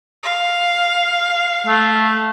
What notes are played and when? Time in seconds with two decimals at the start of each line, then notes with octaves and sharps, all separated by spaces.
0.23 F5
1.67 A3